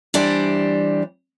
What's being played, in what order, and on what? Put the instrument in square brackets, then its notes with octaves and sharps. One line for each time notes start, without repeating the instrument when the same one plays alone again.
[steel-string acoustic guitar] E3 G3 D4 G4 C5